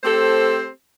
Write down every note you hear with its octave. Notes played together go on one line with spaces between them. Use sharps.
A3 C4 G4 A4 C5